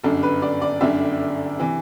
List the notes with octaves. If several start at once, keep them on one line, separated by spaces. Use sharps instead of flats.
G1 F#2 D3 A4
B4
D5
D5
G1 F#2 D3 E5
C3 E3